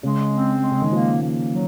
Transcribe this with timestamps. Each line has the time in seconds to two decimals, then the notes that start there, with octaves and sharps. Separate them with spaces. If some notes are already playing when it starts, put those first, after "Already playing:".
0.03 C#3 G#3
0.33 C4
0.62 G#3
0.71 C#3
0.81 D#3
0.91 F3 A#3
1.21 A#3
1.51 F#3